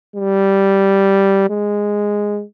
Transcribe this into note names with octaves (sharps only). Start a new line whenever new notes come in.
G3
G#3